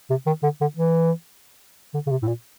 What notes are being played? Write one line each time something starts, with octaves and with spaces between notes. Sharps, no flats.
C3
D#3
D3
D3
E3
D3
C#3
C3
A2
A#2